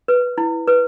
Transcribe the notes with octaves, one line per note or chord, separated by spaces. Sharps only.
B4
E4
B4